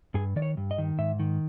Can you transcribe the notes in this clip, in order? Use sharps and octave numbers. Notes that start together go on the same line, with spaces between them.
G2 G#4
D#3 D5
C#5
G2
D#5
D#3
G#2 E5
D#3